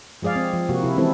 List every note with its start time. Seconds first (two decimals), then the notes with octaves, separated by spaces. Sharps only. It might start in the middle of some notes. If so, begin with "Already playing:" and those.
0.22 F3 G#3 G#4 D5 F5
0.36 C4
0.53 F3
0.69 C3 A#3 F#4
0.83 C3 E4
0.96 E3 G#3 C4 C#4 E4 A4